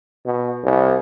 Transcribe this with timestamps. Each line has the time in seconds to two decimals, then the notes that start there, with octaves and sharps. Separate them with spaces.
0.26 B2
0.64 C2